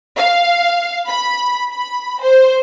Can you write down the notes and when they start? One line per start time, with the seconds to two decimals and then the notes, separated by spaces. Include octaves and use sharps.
0.17 F5
1.08 B5
1.70 B5
2.21 C5